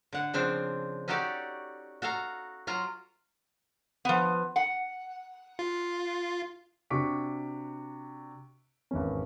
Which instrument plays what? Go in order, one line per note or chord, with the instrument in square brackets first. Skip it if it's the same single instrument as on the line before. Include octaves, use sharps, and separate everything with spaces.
[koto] D3 F#5
C#3 F3 C4 D4
C#4 D#4 F#4 G4 A4 D5
F#4 A4 F5 A#5
F#3 F4 A#5
[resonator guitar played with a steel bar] F3 B3
F#5
[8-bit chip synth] F4
[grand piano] C3 D4 F#4 C#6 D6 B6
G#1 E2 C#4